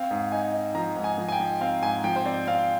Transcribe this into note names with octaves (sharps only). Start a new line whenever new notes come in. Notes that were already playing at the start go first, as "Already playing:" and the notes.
Already playing: C4 F5
G#2
D#4 G#5
D#4
F3 A#5
G#2
G#5
F3
G#5
G5
F3
C4 F5
G#2 G#5
F3 G5
C5
C4 D5
C4 F5